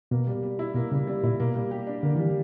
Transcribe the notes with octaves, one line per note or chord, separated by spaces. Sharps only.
B2 A#3
G3
G3
E4
B2 A#3
C#3 G3
G3
A#2 E4
B2 A#3
G3
G4
D4
D3 A#3
E3 G3